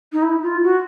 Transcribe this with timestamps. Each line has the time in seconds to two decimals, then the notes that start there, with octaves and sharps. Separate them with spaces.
0.13 D#4
0.23 E4
0.43 F4
0.63 F#4